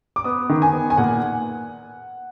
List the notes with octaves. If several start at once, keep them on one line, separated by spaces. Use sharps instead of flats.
D6
B3 D#6
D#3
G#5
B3
G#5
A#2 F#5